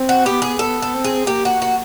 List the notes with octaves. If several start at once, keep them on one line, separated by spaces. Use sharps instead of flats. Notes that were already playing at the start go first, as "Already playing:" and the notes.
Already playing: C4
F#4
B3 G4
G#4
B3 A4
A4
C4
G#4
A#3 G4
F#4
F#4